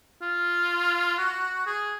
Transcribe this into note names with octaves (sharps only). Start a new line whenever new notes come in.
F4
F#4
G#4